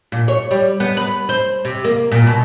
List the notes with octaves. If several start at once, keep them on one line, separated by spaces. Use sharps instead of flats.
A#2
C#5
G3
B3
B4
C5
C3
A#3
A#2
B2